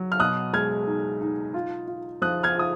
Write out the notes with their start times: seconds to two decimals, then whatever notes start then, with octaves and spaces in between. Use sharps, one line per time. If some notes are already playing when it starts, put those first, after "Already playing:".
Already playing: F#3
0.12 F6
0.20 B2 D#6 F#6
0.53 G#3 F6 G#6
0.87 D#4
1.21 D#4
1.54 F4
1.88 F4
2.22 F3 D#6 F#6
2.43 F6 G#6
2.55 F4 D#6